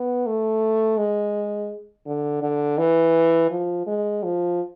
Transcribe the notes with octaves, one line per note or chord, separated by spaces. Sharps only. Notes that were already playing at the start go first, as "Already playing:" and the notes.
Already playing: B3
A3
G#3
D3
D3
E3
F3
G#3
F3